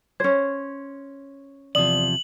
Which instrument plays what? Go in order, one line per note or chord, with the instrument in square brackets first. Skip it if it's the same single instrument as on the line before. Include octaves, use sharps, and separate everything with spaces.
[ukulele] C#4 C5 [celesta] G#6
[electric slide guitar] E2 C3 F3 [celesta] D5 D#6 [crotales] F#7